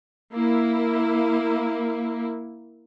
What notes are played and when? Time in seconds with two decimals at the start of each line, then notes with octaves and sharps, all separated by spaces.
0.33 A#3 E4